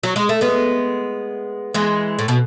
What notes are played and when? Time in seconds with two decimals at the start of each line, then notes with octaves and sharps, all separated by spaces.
0.03 F#3
0.16 G#3
0.29 A3
0.41 G#3 B3
1.74 E3 G#3
2.19 A2
2.28 B2